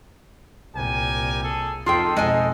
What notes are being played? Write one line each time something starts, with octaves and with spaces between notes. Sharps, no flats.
C2 A#2 G4 A#4 G#5
G#4 A4
F2 D#4 F4 G#4 A4 G5
F2 B2 G#3 D#5 G#5